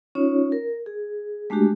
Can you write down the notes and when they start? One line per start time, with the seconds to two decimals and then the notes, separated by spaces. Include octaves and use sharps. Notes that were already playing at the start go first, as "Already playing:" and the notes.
0.15 C#4 D#4 F4 C#5
0.52 A#4
0.86 G#4
1.50 G#3 A3 D4 F#4 G4